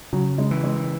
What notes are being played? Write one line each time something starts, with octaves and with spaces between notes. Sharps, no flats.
C#3 F#3
G#3
E3
G#3